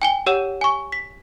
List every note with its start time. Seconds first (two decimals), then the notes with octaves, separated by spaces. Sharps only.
0.02 G5 G#5 G7
0.26 G4 C#5 F#5 E6 E7
0.61 G#5 C#6
0.92 B6